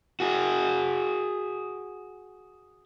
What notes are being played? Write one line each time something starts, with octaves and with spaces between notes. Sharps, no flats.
F#4 G#4